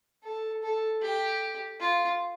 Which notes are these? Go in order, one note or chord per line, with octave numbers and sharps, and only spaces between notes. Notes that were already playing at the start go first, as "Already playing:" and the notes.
A4
A4
G4
F4